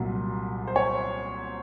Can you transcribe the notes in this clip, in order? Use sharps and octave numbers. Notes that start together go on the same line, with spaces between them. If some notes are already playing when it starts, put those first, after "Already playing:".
Already playing: C2 A#2 F#3
C5
C#5